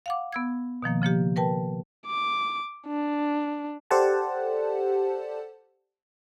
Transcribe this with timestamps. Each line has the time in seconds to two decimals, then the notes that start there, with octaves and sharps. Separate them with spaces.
0.06 F5 F#5 D6
0.32 B3 E6 G#6
0.83 B2 D#3 F3 A#3
1.02 C#3 F3 A#3 G4
1.36 A#4 B4 G5 A5
2.07 D6
2.87 D4
3.91 G4 A4 C5 D5 F#5 A5